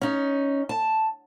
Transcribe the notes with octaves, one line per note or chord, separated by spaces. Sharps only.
C#4 D#4
A5